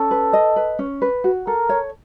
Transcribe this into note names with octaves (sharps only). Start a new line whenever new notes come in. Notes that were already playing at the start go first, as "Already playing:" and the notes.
Already playing: C#4 A4
B4
D#5
B4
C#4
B4
F#4
A4 A#4
C#5